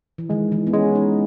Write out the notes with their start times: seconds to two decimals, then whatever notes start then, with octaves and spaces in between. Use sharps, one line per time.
0.18 E3
0.29 D#3 G#3
0.52 E3
0.67 B3
0.73 G#3 C#4
0.95 D#4